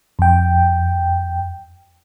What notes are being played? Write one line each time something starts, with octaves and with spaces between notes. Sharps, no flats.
F2 G5